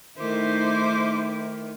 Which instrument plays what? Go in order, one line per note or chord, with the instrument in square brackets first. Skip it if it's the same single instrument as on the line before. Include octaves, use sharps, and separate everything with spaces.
[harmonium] D#3 [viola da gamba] A3 D#4 E4 [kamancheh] C5 D6